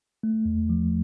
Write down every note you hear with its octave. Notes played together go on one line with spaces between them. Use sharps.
A3
E2
F3